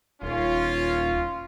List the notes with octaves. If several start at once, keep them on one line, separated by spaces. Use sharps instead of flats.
D#1 C#4 F4